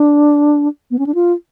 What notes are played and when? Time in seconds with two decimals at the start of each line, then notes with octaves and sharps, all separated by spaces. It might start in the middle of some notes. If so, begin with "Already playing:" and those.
Already playing: D4
0.91 B3
0.99 C#4
1.07 D4
1.15 F4